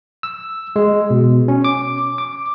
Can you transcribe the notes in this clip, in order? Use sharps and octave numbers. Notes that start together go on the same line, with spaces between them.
E6
G#3
B2
C#4
D6
D6